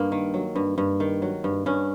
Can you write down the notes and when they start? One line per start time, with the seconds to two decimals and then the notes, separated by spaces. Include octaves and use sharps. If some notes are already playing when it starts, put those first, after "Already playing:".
Already playing: G2 A#3
0.12 D#3
0.34 F#3
0.56 G2
0.78 G2
1.00 D#3
1.22 F#3
1.44 G2
1.66 G2 C#4